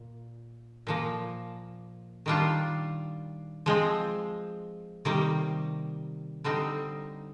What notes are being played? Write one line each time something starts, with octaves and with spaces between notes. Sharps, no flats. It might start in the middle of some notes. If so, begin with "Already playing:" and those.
Already playing: A#2
A#2 F3 A#3
D#3 G3 D4 F4
F3 G#3 C4
C3 D#3 G3 A#3
D3 G3 C4 D#4